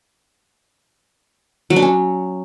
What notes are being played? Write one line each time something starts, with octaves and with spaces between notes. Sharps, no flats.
F#3
D4
C#4